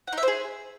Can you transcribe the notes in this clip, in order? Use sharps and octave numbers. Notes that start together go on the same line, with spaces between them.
F#5
D#4
E5
C5
G#4